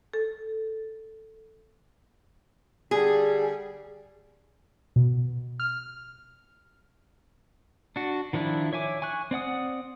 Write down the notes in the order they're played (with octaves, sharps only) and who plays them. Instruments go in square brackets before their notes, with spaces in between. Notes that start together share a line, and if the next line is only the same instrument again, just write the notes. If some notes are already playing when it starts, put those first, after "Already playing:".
[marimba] A4
[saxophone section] D3 G3 [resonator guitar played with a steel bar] G#4
[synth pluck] B2
F6
[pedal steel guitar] D4 F#4
D#3 F3 D4 E4
C#5 E5 G#5 D6
G#5 C#6 F#6
C4 D5 F#5 D#6